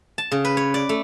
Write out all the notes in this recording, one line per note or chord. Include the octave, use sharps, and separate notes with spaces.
A5
C#3
B4
C#5
D5
A3